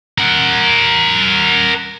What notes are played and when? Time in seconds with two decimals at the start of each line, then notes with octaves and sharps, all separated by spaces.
0.18 A#4 F#5